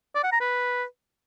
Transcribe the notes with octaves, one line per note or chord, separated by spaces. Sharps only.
D5
F#5
A#5
B4